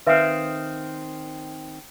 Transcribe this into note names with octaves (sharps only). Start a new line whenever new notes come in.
D#3 C4 B4 E5 F5